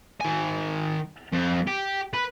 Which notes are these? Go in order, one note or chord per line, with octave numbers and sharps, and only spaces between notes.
D#3 G#5
F2
G4
B4